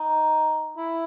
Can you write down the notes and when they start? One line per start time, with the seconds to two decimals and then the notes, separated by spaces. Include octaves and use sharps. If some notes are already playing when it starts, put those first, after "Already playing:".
Already playing: D#4
0.77 E4